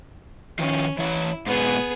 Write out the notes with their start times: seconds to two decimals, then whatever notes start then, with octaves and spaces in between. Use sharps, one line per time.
0.59 D#3 F3 C#4
0.98 E3 E4 C#5
1.46 G#2 B2 B3 G#4